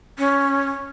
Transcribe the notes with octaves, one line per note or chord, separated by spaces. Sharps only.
C#4